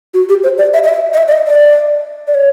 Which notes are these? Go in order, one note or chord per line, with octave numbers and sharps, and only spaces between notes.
F#4
G4
C5
D5
E5
D#5
E5
D#5
E5
D5
D#5
D5
D5
C#5